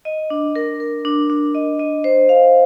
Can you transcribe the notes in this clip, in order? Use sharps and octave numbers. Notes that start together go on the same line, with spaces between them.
D#5
D4
A#4
A#4
D4
D4
D#5
D#5
C5
F5